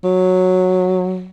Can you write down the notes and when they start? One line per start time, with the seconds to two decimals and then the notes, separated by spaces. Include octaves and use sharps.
0.04 F#3